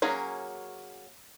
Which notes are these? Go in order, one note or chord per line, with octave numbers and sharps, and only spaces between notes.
F#3 A#3 C#4 G#4